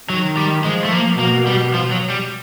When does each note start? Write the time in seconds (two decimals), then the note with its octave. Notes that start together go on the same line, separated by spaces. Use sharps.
0.10 D#3 F#3
0.37 G3
0.64 F3 G#3
0.85 A3
0.92 A#3
1.19 B2 A#3
1.47 G3
1.74 F3
1.91 F#3
2.10 G3